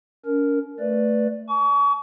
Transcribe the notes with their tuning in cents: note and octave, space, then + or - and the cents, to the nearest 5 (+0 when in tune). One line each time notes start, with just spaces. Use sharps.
C#4 +40 A#4 +0
A3 +5 B4 +0 D5 +0
G#5 +40 C#6 +35